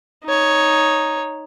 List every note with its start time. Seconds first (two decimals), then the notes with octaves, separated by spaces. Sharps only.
0.25 D#4 C#5